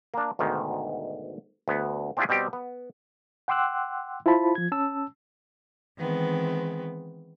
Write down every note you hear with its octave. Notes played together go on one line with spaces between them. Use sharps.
A#3 D4
D2 G#2 B2 D#3
D2 B3
C4 D4 E4 F4 G4 G#4
B2 G3 C4 G4
B3
F#5 G5 C6 D6 E6 F#6
E4 F4 C5 A5 B5
F3 G#6
C#4 A5 E6
D#3 E3 G#3 B3 C4